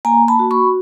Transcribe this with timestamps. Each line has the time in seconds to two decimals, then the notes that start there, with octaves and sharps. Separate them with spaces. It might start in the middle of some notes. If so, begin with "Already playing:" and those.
0.05 A#3 G#5 A#5
0.28 A5 B5
0.39 F#4
0.51 B5 C#6